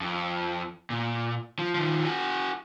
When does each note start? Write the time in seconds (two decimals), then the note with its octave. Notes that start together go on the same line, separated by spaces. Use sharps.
0.01 F2
0.90 A#2
1.59 F3
1.75 D#3 F3
2.05 F#4 G#4